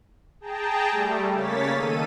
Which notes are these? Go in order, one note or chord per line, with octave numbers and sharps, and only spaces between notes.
G#4 G5 A5 A#5
G3 A3
C#3 A#3 C#5 A6 B6
D#3 A4 D#7